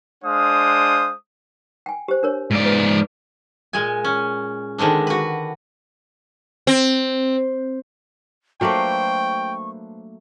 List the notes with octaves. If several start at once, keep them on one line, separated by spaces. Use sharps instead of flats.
G#3 D4 C5 F5 D#6
G5 G#5
G4 C5
D4 A#4 C#5
G#2 D5
B4
A#2 G#3 G#5
C#4
D3 D#3 G#3 C4 D4
F#4 B4
C4
F#3 A3 A#3 D4 B4 C5 G5 C#6